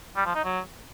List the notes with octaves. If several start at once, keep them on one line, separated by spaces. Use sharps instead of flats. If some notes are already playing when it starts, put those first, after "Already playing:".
G3
F3
D#4
F#3